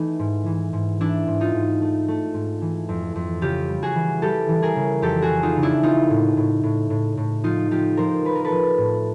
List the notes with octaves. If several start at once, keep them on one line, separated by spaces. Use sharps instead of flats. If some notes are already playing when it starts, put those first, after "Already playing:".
Already playing: E3 A3 D#4
G#2
E3
G#2
E3 D4 E4
G#2
D#4 F4
G#2
A3
A3
G#2
E3
F2
F2
C#3 F4 G4
G3
F#4 G#4
E3
G3 G4 A4
E3
G#4 A#4
C#3
F2 G4 A4
F#4 G#4
C#3
D#4 F4
C#3
D4 E4
A#3 D#4 F4
A2
A2
A2
A2
A2
F3 D#4 F4
F3 F4 G4
F3 A#4 C5
F3 B4
A#4
A4 B4
F3
A2